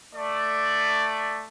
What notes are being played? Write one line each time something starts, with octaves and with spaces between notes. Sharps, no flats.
A3 D5